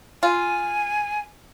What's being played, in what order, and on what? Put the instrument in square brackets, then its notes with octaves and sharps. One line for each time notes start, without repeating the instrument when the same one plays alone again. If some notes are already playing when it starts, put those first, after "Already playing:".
[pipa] F4 [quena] G#5